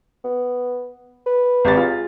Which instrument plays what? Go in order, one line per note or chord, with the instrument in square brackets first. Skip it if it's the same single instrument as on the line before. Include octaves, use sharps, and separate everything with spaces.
[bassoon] B3
B4
[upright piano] G#1 G4 A6
F4 G#4